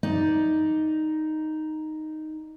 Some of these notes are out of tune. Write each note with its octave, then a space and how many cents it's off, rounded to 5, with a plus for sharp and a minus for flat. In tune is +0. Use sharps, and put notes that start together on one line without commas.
D#4 +0 D5 +0